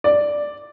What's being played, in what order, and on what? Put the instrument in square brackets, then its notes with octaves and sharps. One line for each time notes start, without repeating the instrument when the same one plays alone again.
[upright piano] D5